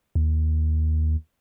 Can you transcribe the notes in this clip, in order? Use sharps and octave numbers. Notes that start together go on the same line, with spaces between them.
D#2